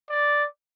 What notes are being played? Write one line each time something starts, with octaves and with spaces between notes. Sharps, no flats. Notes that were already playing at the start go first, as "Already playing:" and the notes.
D5